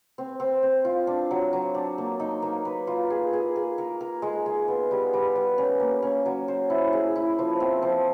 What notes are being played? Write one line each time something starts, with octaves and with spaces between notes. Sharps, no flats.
C4
C4
C4
F4
D4
F#3
F#3
D4
A#3
D#4
A#3
B4
F4
G#4
G#4
G#4
A#4
A#4
G#3
G#3
B3
G3
G3
G3
C#4
A#3
C#4
F#3
C5
E4
G#4
E4
F3
C4
F3